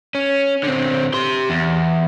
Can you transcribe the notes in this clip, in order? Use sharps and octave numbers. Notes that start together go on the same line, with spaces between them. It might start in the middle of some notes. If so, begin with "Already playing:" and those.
C#4
D3 C4
G4 C6
E2